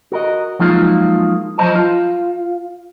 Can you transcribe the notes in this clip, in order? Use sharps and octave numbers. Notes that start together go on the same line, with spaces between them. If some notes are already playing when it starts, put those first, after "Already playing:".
F#4 A#4 D#5
F3 F#3 G#3 A#3 D#4 F4
F3 F#3 C5 D#5 A5
F4